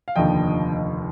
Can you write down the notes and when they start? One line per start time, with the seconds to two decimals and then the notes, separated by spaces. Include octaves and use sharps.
0.08 F5
0.16 F1 D#2 D3 F3 D#5 G5